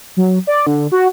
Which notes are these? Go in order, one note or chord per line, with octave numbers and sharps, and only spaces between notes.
F#3
D5
D3
F#4